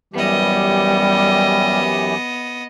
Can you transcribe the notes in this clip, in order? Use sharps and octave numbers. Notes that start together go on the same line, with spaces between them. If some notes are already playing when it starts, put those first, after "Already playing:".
F#2 E3 G3 B3 G4 D#5